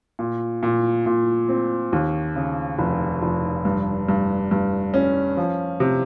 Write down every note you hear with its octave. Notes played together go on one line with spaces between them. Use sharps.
A#2
A#2
A#2
C4
D#2
C#3
F1
F1
G2
G2
G2
C#4
F3
C3